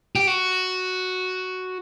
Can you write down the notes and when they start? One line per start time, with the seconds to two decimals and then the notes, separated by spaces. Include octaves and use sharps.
0.16 G4
0.27 F#4